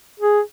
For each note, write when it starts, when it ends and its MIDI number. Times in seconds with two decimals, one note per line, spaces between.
0.20 0.41 68